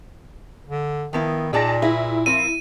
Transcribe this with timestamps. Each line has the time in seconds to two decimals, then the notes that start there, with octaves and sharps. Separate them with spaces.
0.68 D3
1.13 D#3 F3 B3 E4
1.53 A#2 D#4 G#4 D5 G5 A5 A#6
1.82 E4 G#4 B4 E5
2.26 F3 C4 A#4 D#7